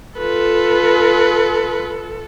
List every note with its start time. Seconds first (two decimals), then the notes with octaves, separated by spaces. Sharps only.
0.18 F4 A4 B4